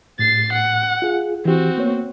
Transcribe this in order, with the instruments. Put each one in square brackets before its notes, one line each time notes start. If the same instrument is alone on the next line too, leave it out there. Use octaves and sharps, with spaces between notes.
[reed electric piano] A2 [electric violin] A6 C7
[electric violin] F#5
[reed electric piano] F4 G#4
[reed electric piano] E3 G4 [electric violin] C4 F#4
[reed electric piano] A#3 B3 C#5